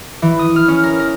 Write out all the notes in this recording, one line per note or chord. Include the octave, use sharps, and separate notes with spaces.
E3
D#6
F6
C#4
A#4
A#4